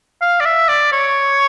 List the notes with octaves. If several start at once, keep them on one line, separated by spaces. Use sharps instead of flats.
F5
D5
E5
D5
C#5